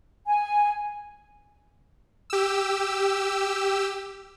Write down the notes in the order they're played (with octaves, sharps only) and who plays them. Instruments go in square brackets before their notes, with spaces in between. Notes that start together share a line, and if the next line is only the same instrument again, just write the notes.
[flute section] G#5
[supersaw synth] G4 E6